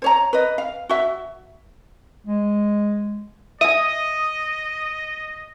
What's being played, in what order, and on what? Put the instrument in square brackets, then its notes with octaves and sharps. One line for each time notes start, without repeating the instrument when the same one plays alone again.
[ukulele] C5 C#5 A#5
B4 D#5
F5
F#4 E5
[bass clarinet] G#3
[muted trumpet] D#5 [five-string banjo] E5 G#5 [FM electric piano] D#6